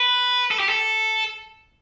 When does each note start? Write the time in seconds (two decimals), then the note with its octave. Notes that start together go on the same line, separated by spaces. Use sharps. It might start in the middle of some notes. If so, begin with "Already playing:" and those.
Already playing: B4
0.51 A4
0.60 G4
0.69 A4